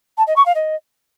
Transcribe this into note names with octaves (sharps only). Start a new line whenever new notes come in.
A5
D#5
C#6
F5
D#5